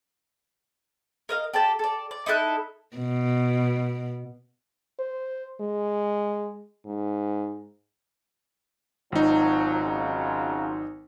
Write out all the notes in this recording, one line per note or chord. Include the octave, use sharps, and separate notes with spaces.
A#4 D#5 F5
G4 A4 D5 A5
A4 D5
D5
D#4 E4 A4 F#6
B2
C5
G#3
G#2
G#1 F3 F#3 D#4
C#3 F3 F#3